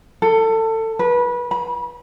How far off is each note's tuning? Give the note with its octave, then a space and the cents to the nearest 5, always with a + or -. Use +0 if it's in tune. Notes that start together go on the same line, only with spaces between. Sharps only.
A4 +25
B4 -25
B5 -35